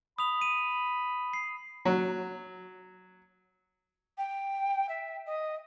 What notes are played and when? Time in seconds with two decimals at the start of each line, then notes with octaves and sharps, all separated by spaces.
0.19 B5 D#6 F7
0.41 D#7
1.33 C7
1.85 F#3
4.18 G5
4.89 E5
5.26 D#5